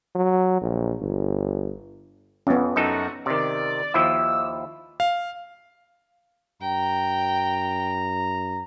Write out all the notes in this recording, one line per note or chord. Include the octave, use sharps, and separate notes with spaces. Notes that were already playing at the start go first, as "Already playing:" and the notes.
F#3
A#1
G1
F2 B3 C#4
F#2 C3 A3 D#4 F#4 A4
C3 D#3 D5
D#2 F3 E4 E6
F5
F#2 G5 A#5